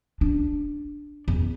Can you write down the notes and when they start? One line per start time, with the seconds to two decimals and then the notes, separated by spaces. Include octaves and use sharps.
0.21 D4
1.28 E2